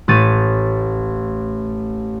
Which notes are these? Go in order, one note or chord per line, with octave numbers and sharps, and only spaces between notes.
A1 A3 A6 D#7